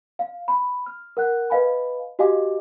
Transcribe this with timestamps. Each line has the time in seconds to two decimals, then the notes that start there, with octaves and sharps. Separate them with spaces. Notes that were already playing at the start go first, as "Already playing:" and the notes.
0.19 F5
0.48 B5
0.86 F6
1.17 A#4 F#5 F#6
1.50 B4 D#5 F5 G#5 B5
2.19 F#4 G4 D#5 F5 G#5 D6